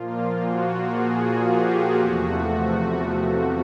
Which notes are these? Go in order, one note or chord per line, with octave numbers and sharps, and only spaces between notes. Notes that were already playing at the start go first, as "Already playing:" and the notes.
Already playing: A#2 F3 A#3 F4
F#4
F#4 G#4
F4 G4
E2 C3 F3 A3 F#4
F#4